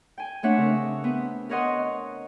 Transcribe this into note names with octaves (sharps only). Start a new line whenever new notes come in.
G5 G#5
A3 C4 D4 C#5 E5 F#5
C#3 D4 A#4
B3 C4 B4
A#4 B4 C#5 D#5 F#5 C6